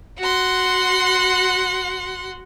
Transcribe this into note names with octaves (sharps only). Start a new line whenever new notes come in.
F#4 F#5 C6